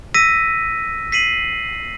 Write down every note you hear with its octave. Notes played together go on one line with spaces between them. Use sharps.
E6 A#6 B6 D#7
B6 C7 D#7 F#7